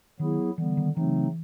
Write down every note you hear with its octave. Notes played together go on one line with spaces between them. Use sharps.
D#3 F#3 B3 E4 G#4
D3 E3 G3 B3
D#3
C#3 E3 F#3 A3 C4 D#4